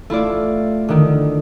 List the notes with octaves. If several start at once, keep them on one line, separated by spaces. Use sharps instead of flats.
A3 E4 F4 D5
D3 D#3